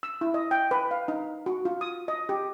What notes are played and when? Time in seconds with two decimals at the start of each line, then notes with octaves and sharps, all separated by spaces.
0.03 E6
0.21 E4
0.34 D#5
0.51 G5
0.71 B4
0.91 F5
1.08 D#4
1.46 F#4
1.65 F4
1.81 D#6
2.08 D#5
2.29 G4